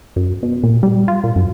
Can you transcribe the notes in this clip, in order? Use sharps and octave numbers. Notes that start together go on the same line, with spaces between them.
F#2
B2
A#2
G3
F4
A#2
F#2